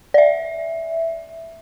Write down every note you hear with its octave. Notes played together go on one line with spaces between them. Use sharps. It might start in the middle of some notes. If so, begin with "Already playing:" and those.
D5
E5